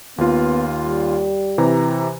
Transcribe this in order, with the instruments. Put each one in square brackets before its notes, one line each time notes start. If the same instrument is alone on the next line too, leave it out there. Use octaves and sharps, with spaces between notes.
[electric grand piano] D#2 F4 [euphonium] B3
[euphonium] G3
[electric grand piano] C3 E3 A#5